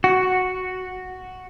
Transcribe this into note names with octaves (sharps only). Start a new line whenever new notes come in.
F#4